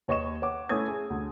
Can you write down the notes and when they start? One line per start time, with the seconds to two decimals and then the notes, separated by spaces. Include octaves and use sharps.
0.08 D#2 C#5 D#5 C#6 E7
0.42 C#5 F#5 D6
0.69 A3 C#4 E4 C#5 D#6 G#6
0.88 G#4
1.10 D2